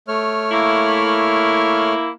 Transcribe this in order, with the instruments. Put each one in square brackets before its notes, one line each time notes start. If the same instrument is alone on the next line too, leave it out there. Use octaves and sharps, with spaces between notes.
[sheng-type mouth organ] A3 C#5 F6
[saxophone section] A#3 E4